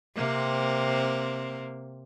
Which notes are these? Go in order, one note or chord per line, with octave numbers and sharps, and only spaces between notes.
C3 A#3 C4